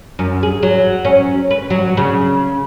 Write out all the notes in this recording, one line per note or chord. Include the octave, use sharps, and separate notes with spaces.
F#2
G#4
F#3
C#4
B4
F#3
C#3